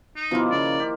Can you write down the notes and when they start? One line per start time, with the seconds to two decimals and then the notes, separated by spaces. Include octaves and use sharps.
0.16 D#4
0.31 B2 D#3 F3 A#3 E4 F4
0.51 C#3 D5
0.80 G4